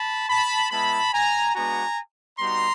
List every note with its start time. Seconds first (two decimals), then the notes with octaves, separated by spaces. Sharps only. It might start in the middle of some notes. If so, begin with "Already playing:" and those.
Already playing: A5 B5
0.29 A5 B5
0.71 G#3 B3 E4 A5 B5
1.13 G#5 A#5
1.55 G#3 B3 D4 F#4 G#5 A#5
2.39 G3 B3 D#4 F#4 A#5 C6